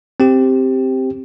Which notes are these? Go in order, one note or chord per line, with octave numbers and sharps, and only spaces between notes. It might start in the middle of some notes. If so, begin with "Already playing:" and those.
C4 G4